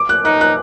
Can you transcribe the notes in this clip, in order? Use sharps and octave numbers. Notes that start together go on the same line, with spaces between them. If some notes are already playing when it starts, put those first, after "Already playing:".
Already playing: D6
F#6
D#4 F#6
F#6